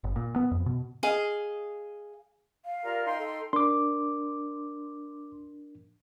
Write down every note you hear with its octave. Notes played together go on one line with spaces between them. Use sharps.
G1
A#2
B3
F2
B2
G#4 D#5 F5
F5
G3 F4 A#4
D#4 G5 C6
A4
D4 A#4 C6 D6